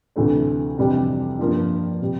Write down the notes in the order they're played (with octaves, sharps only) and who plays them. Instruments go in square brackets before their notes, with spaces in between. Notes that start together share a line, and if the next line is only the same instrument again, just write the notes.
[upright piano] D2 C3 E3 A3 D4
F2 C3 E3 G3 D4
G2 F3 A#3
C3 G3